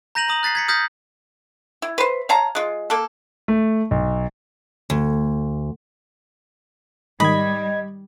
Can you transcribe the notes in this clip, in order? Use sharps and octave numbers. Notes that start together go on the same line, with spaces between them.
A#5 G6 A#6 D#7 F7 F#7
A#5 D#6 F#7
F#6 A6 B6 C7
G#6 B6 C#7
D#6 F6 G6 G#6 A#6 B6
E4
B4 C5
C#5 F5 A5 A#5
G#3 F4
A#3 A4
A3
B1
D2
G#2 D#3 G3 D#5 B5 G#6